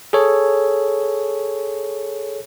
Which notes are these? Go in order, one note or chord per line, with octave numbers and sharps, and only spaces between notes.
G#4 A4 C#5